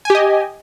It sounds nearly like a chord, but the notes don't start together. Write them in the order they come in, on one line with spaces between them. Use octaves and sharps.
G#5 G4 D#5